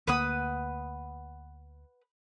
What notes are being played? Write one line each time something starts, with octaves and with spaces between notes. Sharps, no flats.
D2 A#3 B4 F#5 D#6